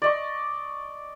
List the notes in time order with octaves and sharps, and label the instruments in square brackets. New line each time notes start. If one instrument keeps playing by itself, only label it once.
[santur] D5 D#5 C#6